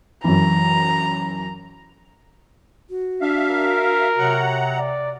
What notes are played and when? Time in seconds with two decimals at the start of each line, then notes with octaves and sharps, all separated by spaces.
0.24 F#2 E3 A#5
2.90 F#4
3.21 D4 E5 F5
3.51 A#4
4.18 C3 F#3 F#5 A#5
4.78 D5